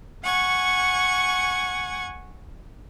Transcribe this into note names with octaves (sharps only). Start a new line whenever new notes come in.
F#5 G#5 C#6 G#6